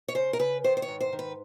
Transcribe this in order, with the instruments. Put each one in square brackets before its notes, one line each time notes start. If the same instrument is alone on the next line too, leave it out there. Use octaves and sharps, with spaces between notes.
[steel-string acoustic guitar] C#5
C#3 C5
A#4
C#3 B4
D#3 C5
C5
C#5
G#2
C5
D#3
B4